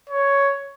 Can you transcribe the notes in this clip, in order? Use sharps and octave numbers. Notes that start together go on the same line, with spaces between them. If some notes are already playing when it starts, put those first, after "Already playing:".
C#5